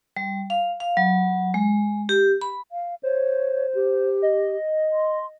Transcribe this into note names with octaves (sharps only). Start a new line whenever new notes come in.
G3
F5
F5
F#3
G#3
G4
B5
F5
C5 C#5
G4
D#5
C6